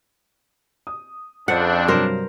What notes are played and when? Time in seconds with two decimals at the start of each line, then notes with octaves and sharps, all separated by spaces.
0.87 D#6
1.48 F2 C#3 C4 D4 F#5
1.88 G2 C3 F#3 A#4 C5